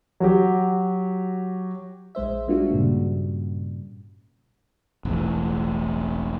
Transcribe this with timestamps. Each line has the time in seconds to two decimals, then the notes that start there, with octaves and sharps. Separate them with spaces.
0.20 F#3 F#4 G4
2.15 A#1 G#3 C5 E5
2.48 G3 A#3 D4 F4 F#4
2.72 G2 A#2 C#3 G3
5.05 E1 A1 A2